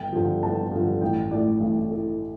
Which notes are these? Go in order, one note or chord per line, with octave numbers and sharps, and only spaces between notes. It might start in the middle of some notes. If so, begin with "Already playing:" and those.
Already playing: G1 G5
G2 D3 F3
G1 A5
G2 D3 F3
A1 G5
A2 A3 D5
A1
A2 A3